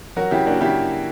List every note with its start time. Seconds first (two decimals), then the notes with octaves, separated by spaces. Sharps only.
0.16 F#3 F#4 A#4
0.31 C#3 E4 G4
0.46 A#3 D4 F#4
0.61 C#3 E4 G4